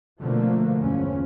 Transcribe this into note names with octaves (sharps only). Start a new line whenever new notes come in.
B2 D3 F3 A3 A#3
G1 E2 F3 C#4